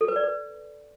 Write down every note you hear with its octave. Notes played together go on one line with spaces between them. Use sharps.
A4
B4
D5
B4